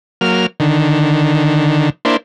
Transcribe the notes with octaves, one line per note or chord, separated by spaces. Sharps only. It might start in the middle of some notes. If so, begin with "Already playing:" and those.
F#3 A#3 F6
D3 D#3
A#3 D4 E4 C5